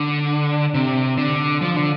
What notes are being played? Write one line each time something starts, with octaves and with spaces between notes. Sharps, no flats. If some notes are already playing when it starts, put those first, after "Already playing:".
Already playing: D3
C3
D3
F3
D3